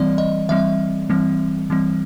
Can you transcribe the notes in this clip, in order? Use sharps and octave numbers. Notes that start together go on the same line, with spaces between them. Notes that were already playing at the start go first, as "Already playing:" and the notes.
Already playing: E3 G3 C4 D5
D#5
E3 G3 C4 E5
E3 G3 C4
E3 G3 C4